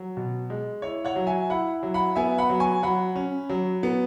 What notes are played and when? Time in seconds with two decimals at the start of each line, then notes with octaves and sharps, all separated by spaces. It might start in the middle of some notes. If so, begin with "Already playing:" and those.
Already playing: F#3
0.17 B2
0.50 G#3
0.82 E4 C#5
1.05 C#5 F#5
1.16 F#3
1.27 E5 G#5
1.50 E4 F#5 B5
1.83 F#3
1.94 F#5 B5
2.16 B3 E5 G#5
2.38 F#5 B5
2.49 F#3
2.60 G#5 C#6
2.82 F#3 F#5 B5
3.16 C#4
3.50 F#3
3.83 B3